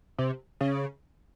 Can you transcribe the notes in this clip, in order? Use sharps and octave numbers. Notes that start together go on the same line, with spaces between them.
C3
C#3